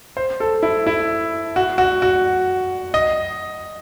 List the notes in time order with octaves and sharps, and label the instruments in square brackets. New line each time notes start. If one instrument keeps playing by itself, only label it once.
[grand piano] C5
A4
E4
E4
F#4
F#4
F#4
D#5